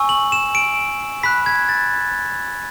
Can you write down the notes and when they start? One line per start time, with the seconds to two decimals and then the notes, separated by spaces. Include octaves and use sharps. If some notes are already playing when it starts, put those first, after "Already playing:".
Already playing: G#5 C#6 E6
0.09 F#7
0.32 E7
0.55 D7
1.23 B5 F#6 B6
1.46 G#6
1.69 A6